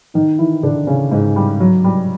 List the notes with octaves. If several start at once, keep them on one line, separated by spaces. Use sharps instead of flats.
D#3 D#4
E3 E4
D3 D4
C#3 C#4
G#2 G#3
G3
F#3
G3